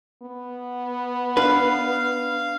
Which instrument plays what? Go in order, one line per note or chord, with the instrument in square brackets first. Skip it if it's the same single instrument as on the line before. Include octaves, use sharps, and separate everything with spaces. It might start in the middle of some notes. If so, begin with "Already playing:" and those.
[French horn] B3
[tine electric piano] D4 [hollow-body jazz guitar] B4 [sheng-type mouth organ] F5